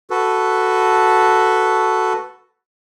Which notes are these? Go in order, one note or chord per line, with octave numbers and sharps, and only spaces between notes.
F#4 A4 B4